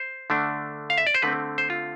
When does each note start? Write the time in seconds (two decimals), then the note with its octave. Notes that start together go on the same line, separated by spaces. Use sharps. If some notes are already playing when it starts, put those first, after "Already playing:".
Already playing: C5
0.30 D3 A3 D4
0.90 F5
0.98 E5
1.07 D5
1.14 C5
1.22 D3 A3 C4 B4
1.58 C5
1.70 F4